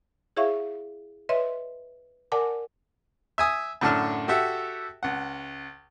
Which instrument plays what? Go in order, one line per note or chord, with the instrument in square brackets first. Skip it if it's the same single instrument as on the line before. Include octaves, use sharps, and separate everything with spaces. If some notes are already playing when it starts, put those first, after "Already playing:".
[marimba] E4 G#4 C#5 E5 F5 C#6
B4 C#5 D#5 E5 C6
A#4 D5 F#5 G#5 A5 D6
[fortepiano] E5 G#5 D#6
F#2 A2 D3 D4 A5 F6
F#4 G4 A4 E5 F#5
C#2 F#5